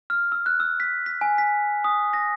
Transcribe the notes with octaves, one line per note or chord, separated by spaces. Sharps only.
F6
E6
F#6
E6
B6
B6
G#5
B6
D#6
A#6